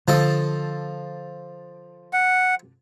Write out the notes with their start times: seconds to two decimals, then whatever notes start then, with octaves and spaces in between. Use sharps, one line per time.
0.08 D3 F3 A4 D#5
2.13 F#5